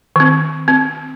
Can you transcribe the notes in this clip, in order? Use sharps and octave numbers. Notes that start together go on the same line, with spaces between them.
D#3 C4
C4